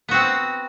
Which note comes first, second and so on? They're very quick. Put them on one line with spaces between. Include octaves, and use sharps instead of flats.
B3 F#4 C4